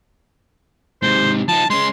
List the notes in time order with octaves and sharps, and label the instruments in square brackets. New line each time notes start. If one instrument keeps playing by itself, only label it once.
[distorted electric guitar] G#2 C3 [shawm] C5
[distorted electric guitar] F3 D#4 [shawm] A5
[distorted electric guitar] G#3 C#4 [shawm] C6